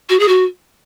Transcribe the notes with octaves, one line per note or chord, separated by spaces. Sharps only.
F#4
G#4
F#4